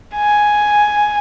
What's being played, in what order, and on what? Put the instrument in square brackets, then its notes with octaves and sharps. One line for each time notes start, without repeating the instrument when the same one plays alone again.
[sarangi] G#5